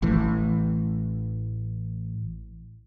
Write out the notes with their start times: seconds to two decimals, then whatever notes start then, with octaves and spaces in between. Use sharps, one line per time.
0.02 A1 A2 E3